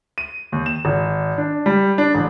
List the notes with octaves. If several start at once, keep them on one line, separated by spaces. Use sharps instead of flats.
D#7
D#2
E7
G#1
D4
G3
D4
A1